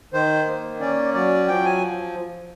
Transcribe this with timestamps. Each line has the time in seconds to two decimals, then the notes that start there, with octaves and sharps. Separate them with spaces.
0.13 D#3 C5
0.47 A#3
0.80 C#4 D5
1.14 F#3 D5
1.47 F3 G5
1.65 G#5